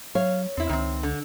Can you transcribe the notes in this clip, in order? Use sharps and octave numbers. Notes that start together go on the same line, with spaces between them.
F#3 C#5 F5
E2 C4 E4
C#2 D#3 C4
D3